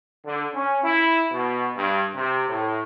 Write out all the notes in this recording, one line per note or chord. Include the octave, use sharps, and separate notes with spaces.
D3
C#4
E4
B2
G2
C3
A2